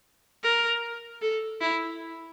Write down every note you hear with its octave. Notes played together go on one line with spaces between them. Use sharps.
A#4
A4
E4